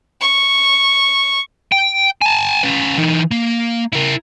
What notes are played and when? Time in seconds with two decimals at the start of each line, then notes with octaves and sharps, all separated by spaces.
0.21 C#6
1.72 G5
2.22 G#5 A5
2.63 C#4 B4
2.98 E3 D#4
3.31 A#3
3.93 E4 A#4